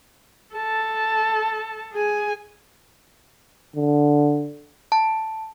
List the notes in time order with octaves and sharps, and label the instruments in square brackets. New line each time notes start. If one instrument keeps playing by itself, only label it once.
[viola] A4 A5
G#4 G#5
[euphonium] D3
[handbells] A5